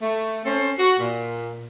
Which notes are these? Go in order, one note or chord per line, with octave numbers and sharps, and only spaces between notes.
A3
C4 C#4 A4 C5
F#4
A#2